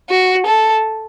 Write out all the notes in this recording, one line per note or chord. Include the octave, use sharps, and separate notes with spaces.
F#4
A4